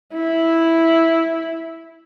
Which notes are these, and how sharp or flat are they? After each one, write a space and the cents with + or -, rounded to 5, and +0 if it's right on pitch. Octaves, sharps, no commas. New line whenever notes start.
E4 -5